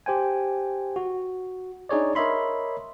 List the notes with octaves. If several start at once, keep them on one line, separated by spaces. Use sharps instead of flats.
G4 C5 G5 G#5
F#4
D4 D#4 G#4 C#5 D5
A#4 C#5 D#5 E5 B5 C6